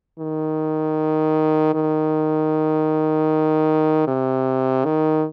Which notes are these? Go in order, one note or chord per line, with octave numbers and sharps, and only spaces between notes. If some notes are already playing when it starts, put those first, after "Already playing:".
D#3
D#3
C3
D#3